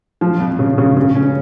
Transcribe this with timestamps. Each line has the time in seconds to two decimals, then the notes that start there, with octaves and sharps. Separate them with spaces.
0.21 F3
0.40 F2
0.59 C#3
0.78 C#3
0.97 C#3
1.15 C#4